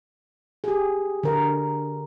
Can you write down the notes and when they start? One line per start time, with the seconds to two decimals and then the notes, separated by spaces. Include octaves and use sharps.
0.64 G4 G#4
1.23 D3 A#4